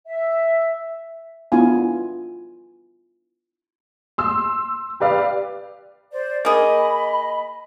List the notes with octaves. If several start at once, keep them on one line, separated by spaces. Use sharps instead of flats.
E5
B3 D4 E4 F4 F5 G#5
C6 E6
G4 B4 D5 F5
C5 D5
A#3 G#4 D#5 B5